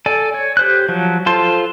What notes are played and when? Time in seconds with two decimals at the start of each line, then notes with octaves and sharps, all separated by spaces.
0.06 A4 D5 G#5
0.34 C#5
0.57 G4 C5 F#6
0.89 F3 F#3
1.26 F4 A4 C5 A5 C6